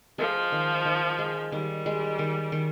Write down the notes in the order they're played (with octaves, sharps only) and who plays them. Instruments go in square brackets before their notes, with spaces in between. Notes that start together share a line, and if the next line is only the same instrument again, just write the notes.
[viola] F3 [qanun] G#3
[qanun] D#3
D#3
G#3
[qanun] D#3 [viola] G3
[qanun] G#3
D#3
D#3